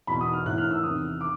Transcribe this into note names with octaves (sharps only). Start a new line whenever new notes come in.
E2 B2 B5
D#6
F6
A2 E3 F#6
F6
E6
E2 C3 D#3 D#6
D6